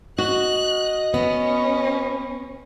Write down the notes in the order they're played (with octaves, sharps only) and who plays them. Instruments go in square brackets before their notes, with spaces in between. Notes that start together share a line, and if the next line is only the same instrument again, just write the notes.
[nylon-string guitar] F#4 [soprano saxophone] D#5 [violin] F#6
[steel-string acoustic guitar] B3 [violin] C#4